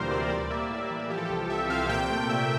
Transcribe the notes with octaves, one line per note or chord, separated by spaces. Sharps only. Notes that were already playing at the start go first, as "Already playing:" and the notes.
Already playing: D2 A#2 E3 G3 A#4 C5
C3 D5
G3 D5
A#3 E5
A2
E3
F3 G4
A4
C2 G4
C2 E5
C3 F5
A#2 G5
A3
A#2 E5